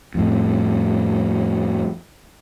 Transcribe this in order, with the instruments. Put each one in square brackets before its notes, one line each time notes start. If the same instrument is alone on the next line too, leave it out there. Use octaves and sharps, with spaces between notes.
[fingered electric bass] F2 A2